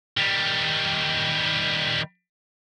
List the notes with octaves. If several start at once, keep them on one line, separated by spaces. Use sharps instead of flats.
D#3 G3